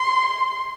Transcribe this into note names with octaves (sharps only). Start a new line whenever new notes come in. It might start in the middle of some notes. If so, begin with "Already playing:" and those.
Already playing: C6